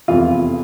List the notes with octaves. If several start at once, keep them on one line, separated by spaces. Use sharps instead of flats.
F1 E2 C3 E3 F4